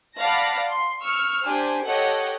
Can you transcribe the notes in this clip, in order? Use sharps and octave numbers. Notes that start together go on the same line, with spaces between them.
D5 F5 F#5 A5 B5 A#6
C6
C#6 E6 F6
D4 G4 C5 G#5
G4 A4 C#5 D#5 F#5